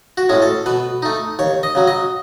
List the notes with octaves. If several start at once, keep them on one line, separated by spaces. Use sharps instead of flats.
F#4
A2 G#3 C#4
A4
B2 B4
A3 D#4
D#2 C#5
D#5
C#3 F#3
D#5